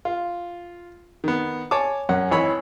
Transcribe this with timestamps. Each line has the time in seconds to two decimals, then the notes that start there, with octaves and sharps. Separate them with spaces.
0.05 F4
1.24 D#3 B3
1.71 C#5 G#5 A5 D6
2.09 F#2 C#4 F#5
2.31 G#1 E3 C#5 B5